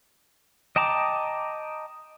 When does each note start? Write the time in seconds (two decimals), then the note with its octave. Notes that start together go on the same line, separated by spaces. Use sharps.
0.76 D#5 G5 A5 A#5 D6